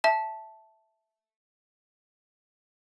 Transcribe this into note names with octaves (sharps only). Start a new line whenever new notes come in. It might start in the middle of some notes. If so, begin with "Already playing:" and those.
E5 A5